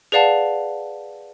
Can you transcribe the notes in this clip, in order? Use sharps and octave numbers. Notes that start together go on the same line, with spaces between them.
G#4 B4 D5 F5 F#5 A5